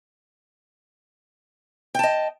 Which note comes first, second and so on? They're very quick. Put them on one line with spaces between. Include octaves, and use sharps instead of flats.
G5 A5 D#5